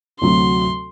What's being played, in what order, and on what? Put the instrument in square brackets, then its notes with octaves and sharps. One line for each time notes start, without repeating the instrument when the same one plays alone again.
[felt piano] D2 C3 F#3 [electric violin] C6